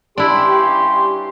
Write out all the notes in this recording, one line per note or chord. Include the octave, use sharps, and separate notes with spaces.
G2 C#4 D4 E4 G4 C6